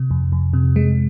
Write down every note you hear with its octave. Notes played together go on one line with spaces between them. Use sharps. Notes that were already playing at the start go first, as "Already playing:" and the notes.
Already playing: C3
F2
F2
C3
G#3